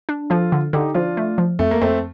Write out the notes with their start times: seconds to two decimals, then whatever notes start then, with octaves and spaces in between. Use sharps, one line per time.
0.09 D4
0.30 F3 F4 A4
0.52 D3
0.73 D3 D#4 G4
0.94 F3 D4 F4
1.17 A3
1.38 F3
1.59 F2 A3
1.71 A#3
1.81 F2 A3 C4